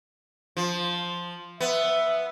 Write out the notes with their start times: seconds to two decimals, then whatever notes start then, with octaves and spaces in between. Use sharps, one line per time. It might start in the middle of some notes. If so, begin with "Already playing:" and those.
0.57 F3
1.61 B3 E5